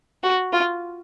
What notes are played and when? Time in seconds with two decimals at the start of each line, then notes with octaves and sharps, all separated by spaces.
0.23 F#4
0.53 F4